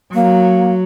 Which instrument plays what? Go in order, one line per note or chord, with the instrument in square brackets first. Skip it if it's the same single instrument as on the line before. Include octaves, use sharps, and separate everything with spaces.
[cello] F#3 [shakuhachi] A#3